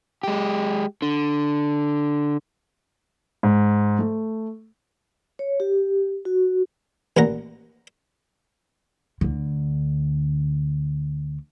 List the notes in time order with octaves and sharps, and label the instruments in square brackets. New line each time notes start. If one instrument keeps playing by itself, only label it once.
[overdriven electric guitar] G#3 G4
D3
[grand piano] G#2
A3
[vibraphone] C#5
G4
F#4
[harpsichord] A1 A#2 F#5 A#5
[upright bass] D2 D3